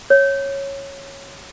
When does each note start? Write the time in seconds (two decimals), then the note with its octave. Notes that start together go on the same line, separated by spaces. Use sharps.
0.10 C#5